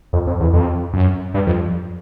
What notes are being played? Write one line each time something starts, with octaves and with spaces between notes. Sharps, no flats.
F2
F2
E2
F2
F#2
G2
F2